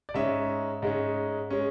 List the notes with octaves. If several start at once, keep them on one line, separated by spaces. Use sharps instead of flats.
D5
G#2 G#3 C#4 E5
G#2 G#3 C#4
G#3 C#4